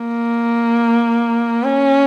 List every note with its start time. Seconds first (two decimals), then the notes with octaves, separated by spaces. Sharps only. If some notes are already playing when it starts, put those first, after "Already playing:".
Already playing: A#3
1.63 C#4